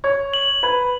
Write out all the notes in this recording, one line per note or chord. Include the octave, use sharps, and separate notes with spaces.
C#5 G#6
F#7
B4 G#6